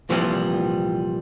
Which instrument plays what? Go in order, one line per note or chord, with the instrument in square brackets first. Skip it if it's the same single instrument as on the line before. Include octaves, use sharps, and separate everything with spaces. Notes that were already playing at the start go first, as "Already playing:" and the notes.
[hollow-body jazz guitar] C2 A#2 E3 F3 G3 C4